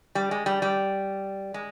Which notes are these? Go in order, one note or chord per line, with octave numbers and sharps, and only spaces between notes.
G3
G#3
G3
G3
G#3